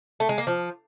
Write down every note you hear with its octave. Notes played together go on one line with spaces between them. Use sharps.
A3
G#3
A#3
F3